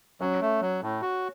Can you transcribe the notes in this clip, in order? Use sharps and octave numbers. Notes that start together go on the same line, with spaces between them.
F#3 C#4
A3
F#3
A2
F#4